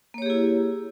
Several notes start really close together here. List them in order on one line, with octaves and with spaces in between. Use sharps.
A#3 C#5 G4 G#4 E4